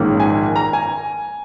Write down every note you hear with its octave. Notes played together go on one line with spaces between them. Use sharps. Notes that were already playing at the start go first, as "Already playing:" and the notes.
Already playing: A#1 G#2 D#3 A#3 C#4
G#5
A#5
G#5